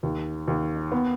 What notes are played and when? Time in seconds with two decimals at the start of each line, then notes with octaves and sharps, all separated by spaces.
0.03 D#2
0.48 D#2
0.92 B3